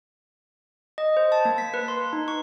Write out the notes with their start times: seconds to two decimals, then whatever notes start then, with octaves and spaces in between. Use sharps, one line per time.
0.98 D#5
1.17 C5
1.32 A5
1.45 A#3
1.58 B6
1.74 B4
1.88 C6
2.13 D#4
2.28 C#6